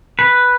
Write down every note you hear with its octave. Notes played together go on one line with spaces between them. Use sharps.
B4